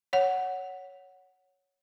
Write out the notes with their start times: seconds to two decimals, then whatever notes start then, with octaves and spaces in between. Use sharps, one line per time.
0.13 C#5 F#5